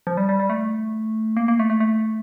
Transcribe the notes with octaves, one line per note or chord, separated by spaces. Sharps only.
F3
G3
G3
G3
A3
A#3
A#3
A3
A3
A3